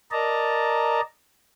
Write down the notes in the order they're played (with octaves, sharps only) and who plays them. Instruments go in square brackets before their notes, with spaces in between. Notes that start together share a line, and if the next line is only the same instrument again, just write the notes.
[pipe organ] A#4 D5 D#5 A5 A#5